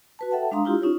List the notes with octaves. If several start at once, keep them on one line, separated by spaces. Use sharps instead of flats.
F#4 B4 A5
A4 E5 F#5 G5 A5
G#3 D4 F5 A#5 C6 D#6
E4 F4 G4
C#4 D#4 F4 C#5